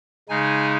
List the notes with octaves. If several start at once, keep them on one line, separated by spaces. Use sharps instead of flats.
C#3 G#3 D#4 G#5